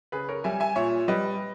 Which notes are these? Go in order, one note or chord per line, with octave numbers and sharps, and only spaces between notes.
C#3 G#4 B4
A#4 C#5
G3 E5 G#5
E5 G#5
A#2 C#5 E5
G3 B4 D#5